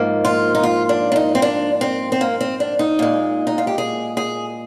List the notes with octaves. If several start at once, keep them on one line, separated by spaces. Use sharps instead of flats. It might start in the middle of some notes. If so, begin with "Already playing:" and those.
Already playing: G#2 F3 A#3
F4
D#4
F4
D4
D4
D#4
C4
D4
C4
C4
A#3
C4
D4
D#4
A#2 G#3
D#4
F4
G4
G#4
G#4